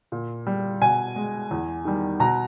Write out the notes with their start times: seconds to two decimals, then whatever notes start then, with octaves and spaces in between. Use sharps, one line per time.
0.12 A#2
0.47 G3
0.82 B2 G#5
1.16 G#3
1.51 E2
1.85 D#3 G3
2.20 B2 A#5